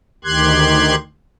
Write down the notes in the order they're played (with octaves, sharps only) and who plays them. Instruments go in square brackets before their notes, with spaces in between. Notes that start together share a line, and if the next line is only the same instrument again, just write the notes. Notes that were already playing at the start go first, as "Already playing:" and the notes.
[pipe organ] D2 D#3 G4 C6 F#6 G#6